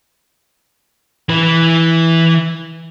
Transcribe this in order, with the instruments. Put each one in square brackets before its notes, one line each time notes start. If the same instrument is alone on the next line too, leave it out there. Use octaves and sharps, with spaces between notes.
[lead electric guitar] E3 B4